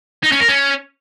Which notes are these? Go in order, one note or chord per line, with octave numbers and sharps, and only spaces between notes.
D#4
C#4
A#4
C#4